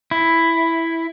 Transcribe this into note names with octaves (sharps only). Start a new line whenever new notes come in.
E4